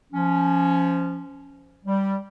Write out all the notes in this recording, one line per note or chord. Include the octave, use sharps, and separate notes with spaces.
F3 C#4
G3